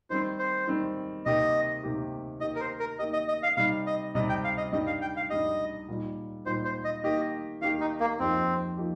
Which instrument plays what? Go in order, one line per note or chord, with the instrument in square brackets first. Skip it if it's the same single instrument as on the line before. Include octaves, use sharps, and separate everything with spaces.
[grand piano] D#3 G3 C4 [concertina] C5
[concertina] C5
[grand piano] D#3 G3 C4
[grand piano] C3 D#3 A#3 G4 [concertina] D#5
[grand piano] C3 D#3 A#3 G4
[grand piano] D#3 A#3 G4 [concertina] D#5
[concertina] A#4
C5
A#4
[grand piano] D#3 A#3 G4 [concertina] D#5
[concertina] D#5
D#5
F5
[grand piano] C3 G3 D#4 [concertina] F5
[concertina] D#5
[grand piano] C3 G3 D#4 [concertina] D#5
[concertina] G5
F5
D#5
[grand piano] G2 G3 D#4 G4 [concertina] D#5
[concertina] F5
G5
F5
[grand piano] G2 G3 D#4 G4 [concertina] D#5
[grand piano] A#2 G3 D#4
[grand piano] A#2 G3 D#4 [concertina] C5
[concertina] C5
D#5
[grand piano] D#3 A#3 G4 [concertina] D#5
[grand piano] D#3 A#3 G4 [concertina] F5
[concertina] D#4
A#3
[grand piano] F2 F3 A#3 D#4 G4 [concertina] C4
[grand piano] F3 A#3 D#4 G4